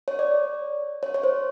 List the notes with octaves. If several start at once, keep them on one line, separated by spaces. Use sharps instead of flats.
C#5
D5
C#5
C#5
C5